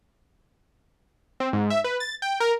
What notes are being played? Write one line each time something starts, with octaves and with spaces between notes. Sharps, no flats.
C4
G#2
E5
B4
A6
G5
A#4